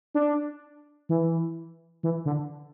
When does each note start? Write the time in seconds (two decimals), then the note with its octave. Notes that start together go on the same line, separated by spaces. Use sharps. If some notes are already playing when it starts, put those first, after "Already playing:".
0.15 D4
1.09 E3
2.03 E3
2.25 D3